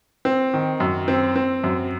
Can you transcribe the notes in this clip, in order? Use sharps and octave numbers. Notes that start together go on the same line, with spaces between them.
C4
D#3
F#2
C4
C4
F#2